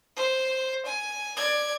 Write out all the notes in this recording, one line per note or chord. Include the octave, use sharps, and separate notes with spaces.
C5
G#5
D5 G#6